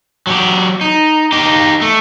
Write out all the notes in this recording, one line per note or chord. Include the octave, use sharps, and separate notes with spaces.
F#3 G4
D#4
D#4 G4
A3